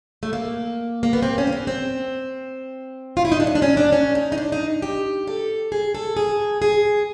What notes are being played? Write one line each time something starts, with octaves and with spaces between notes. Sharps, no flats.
A3
A#3
A#3
B3
C4
C#4
A#3
B3
C4
F4
E4
D#4
D4
C#4
D4
C#4
D4
C#4
D#4
D#4
D4
D#4
G4
A4
G#4
A4
G#4
G#4